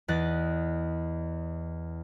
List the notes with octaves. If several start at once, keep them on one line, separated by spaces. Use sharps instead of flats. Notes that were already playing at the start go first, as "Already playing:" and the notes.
E2 D#5 F#6 A6